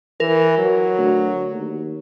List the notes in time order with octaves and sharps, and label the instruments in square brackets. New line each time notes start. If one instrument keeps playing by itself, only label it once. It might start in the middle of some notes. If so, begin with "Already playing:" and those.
[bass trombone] E3 [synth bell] A#4
[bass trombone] F#3
[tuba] D2
D#2